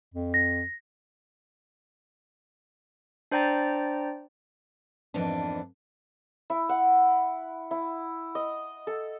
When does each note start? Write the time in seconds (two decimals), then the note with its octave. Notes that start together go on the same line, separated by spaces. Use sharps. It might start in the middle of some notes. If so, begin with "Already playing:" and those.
0.14 F2
0.34 A#6
3.31 D4 C5 D5 G5 A#5 A6
5.14 F2 G#2 E3 A#3 B3 D4
6.50 E4
6.69 F#5
7.71 E4
8.35 D#5
8.87 A4